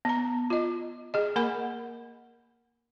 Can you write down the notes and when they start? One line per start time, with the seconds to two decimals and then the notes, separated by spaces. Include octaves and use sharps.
0.05 B3 A#5
0.50 F4 D#5
1.14 G#4 D#5
1.36 A#3 A#4 F#5 B5